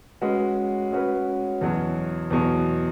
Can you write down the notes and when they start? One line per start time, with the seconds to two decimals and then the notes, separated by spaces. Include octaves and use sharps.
0.21 G#3 C#4 F#4 B4
0.92 G#3 C#4 F#4 B4
1.61 E2 B2 F#3
2.30 E2 B2 F#3